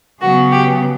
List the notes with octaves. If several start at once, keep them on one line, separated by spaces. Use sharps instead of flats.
C#3 F#3 B3 F#4
G4